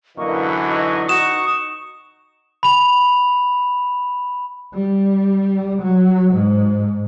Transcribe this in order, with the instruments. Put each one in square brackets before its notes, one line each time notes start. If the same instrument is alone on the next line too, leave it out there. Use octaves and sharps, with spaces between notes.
[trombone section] F#2 D3 E3 [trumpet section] A#3 A#4 D#5 [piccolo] C#6
[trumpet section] D#4 F#4 D#5
[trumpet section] D#4 F#4 [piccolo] C#6 [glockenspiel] D#6 E7
[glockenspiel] B5 F7
[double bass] G3
F#3
G#2